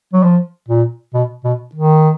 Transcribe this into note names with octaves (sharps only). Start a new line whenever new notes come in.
F#3
F3
A#2
B2
B2
D#3